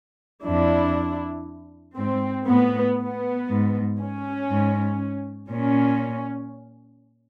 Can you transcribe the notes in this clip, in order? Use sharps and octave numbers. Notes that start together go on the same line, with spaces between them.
F2 D4 E4
G#2 C4
A2 B3
B3
G#2
C#4
G#2
A#2 C#4